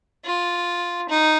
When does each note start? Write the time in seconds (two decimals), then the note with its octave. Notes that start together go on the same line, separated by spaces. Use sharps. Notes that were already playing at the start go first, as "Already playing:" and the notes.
0.25 F4
1.09 D#4